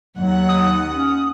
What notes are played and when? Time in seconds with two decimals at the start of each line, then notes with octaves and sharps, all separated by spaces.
0.18 D#2 F#3 F#5
0.49 D#6
0.93 C#4